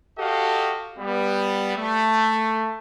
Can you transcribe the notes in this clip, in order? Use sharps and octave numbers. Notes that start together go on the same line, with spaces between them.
F#4 G4 A4 D#5 F5
G3 B3
A3